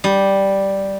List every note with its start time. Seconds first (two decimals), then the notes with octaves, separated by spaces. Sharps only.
0.04 G3